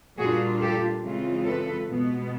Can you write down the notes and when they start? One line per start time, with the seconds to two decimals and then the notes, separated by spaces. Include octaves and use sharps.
0.18 A#2 G3 A#3 D4 F4 F#4 G#4
0.60 G4 A4
1.03 C#3 E3 G#3 C4 F4
1.46 A4 B4
1.89 B2 G#3 B3